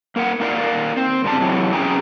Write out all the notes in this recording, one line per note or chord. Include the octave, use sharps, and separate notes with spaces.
A#3 A#4 F5 F#5
A#3 D#4 A#4 D5 F5
C4
G2 C#3 G3 A5
C3 E3 F#3 G#3
F#2 C3 C#4 G#4 G5 A#5